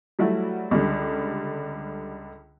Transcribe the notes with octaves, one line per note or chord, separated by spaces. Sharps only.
F#3 G3 A3 E4 F#4
C#2 D3 G3